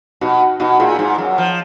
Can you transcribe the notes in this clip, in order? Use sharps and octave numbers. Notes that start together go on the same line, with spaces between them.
B2 D#4 F#4
B2 D#4 F#4
A#2 F4 G#4
G#2
F#2
F3